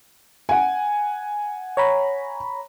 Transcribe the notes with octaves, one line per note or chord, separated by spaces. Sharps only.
F#5 G#5
C#5 A#5 B5